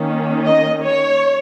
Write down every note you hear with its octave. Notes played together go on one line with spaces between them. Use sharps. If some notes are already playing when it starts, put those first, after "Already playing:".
Already playing: D#3 A#3 C#4
D#5
C#5